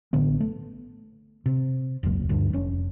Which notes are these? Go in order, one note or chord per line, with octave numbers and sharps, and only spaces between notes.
A1 D3 B3
A3
C3
E1 C#2 F#2 A#3
D2 G2
F1 C#4